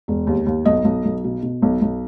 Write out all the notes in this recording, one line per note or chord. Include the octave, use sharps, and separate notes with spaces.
E1
D#2
D#2
B1 D#5
B1
B1
B2
B2
B1
B1